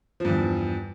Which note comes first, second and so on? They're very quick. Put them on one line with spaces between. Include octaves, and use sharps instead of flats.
F3 G2 E2